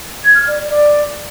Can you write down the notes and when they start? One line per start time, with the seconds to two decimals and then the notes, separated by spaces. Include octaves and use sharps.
0.24 G#6
0.35 F6
0.46 D5
0.57 D5
0.68 D5